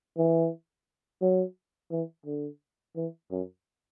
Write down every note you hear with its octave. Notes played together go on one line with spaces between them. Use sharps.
E3
F#3
E3
D3
E3
F#2